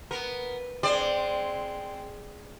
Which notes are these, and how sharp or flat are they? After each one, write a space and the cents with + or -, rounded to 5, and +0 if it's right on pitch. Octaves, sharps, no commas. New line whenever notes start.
B3 +0 A#4 +0
G#3 +0 C4 +0 D5 +15